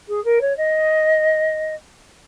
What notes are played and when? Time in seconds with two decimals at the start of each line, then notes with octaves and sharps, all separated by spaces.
0.08 G#4
0.24 A#4
0.41 C#5
0.57 D#5